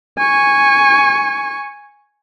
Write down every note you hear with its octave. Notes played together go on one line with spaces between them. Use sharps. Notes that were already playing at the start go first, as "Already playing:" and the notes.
G#5 C#6